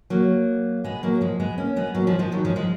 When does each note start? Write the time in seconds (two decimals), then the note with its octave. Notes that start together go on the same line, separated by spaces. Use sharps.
0.10 F#3 A#3
0.84 G#3 B3
1.03 F#3 A#3
1.21 F3 G#3
1.40 G#3 B3
1.58 A#3 C#4
1.76 G#3 B3
1.95 F#3 A#3
2.07 F3 G#3
2.19 F3 G#3
2.32 D#3 F#3
2.45 F3 G#3
2.56 F3 G#3